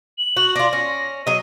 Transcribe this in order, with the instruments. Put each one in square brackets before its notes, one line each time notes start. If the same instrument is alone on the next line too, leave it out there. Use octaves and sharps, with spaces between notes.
[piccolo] F#7
[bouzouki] F#4
[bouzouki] D4 F4 [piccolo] A#6
[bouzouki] C#4 [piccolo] A#6
[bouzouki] F#3 D#5 [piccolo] D#7